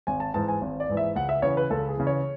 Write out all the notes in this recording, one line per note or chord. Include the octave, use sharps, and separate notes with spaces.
G#1 G#5
A5
G#2 E3 A5
G#5
G#1
D5
G#2 E3
E5
C#2 F#5
E5
C#3 E3 C#5
B4
C#2 A4
G#4
C#3 E3
C#5